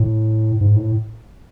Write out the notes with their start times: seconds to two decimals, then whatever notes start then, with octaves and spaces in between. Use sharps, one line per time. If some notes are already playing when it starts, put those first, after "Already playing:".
Already playing: A2
0.61 G#2
0.76 A2